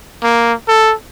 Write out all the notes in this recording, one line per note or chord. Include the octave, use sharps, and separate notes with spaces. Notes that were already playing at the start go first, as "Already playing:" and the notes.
A#3
A4